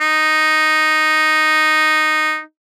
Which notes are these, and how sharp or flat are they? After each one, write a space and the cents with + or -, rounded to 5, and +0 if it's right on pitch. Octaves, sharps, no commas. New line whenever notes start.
D#4 -5